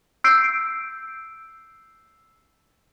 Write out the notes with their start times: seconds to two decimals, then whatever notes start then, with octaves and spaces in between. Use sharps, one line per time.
0.24 E6 G6 C7 D7